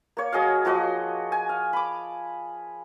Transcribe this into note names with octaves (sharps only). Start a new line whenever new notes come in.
A#3 C#5
F#3 G#4 D#5 F5
F3 A#3 F#4 D#5
G#5
F5
B5 D6